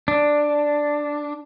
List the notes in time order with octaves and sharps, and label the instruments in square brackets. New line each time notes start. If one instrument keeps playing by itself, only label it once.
[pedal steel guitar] D4